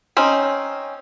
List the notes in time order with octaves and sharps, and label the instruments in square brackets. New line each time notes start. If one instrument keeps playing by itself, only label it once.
[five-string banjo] C4 C#4 D#4